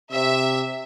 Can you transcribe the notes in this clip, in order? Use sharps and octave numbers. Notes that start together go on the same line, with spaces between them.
C3 E5